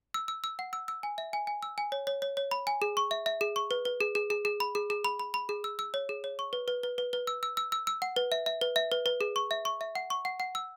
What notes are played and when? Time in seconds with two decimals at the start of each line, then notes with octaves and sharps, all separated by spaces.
0.14 E6
0.28 E6
0.44 E6
0.59 F#5
0.73 E6
0.88 E6
1.03 G#5
1.18 E5
1.33 G#5
1.47 G#5
1.63 E6
1.78 G#5
1.92 C#5
2.07 C#5
2.22 C#5
2.37 C#5
2.51 B5
2.67 G#5
2.82 G#4
2.97 C#6
3.11 E5
3.26 E5
3.41 G#4
3.56 C#6
3.71 B4
3.85 B4
4.01 G#4
4.15 G#4
4.30 G#4
4.45 G#4
4.60 B5
4.75 G#4
4.90 G#4
5.04 B5
5.20 B5
5.34 B5
5.49 G#4
5.64 E6
5.79 E6
5.94 C#5
6.09 G#4
6.24 C#5
6.39 C#6
6.53 B4
6.68 B4
6.83 B4
6.98 B4
7.13 B4
7.27 E6
7.43 E6
7.57 E6
7.72 E6
7.87 E6
8.02 F#5
8.16 B4
8.32 E5
8.46 E5
8.61 B4
8.76 E5
8.92 B4
9.06 B4
9.21 G#4
9.36 C#6
9.51 E5
9.65 C#6
9.81 E5
9.95 F#5
10.10 C#6
10.25 F#5
10.40 F#5
10.55 E6